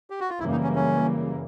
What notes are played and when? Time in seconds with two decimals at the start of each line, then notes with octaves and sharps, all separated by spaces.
0.10 G4
0.20 F#4
0.30 F4
0.39 F#2 C#3 E3 G3 A#3 E4
0.51 D#4
0.63 C#4
0.75 C#4